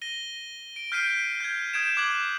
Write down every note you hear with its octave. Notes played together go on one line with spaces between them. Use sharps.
A#6 D#7 G7
D7
F6 G6 B6 C7 D7 D#7
G6 G#6
D#6 G6 G#6 D7 E7
D6 F#6 G#6 F#7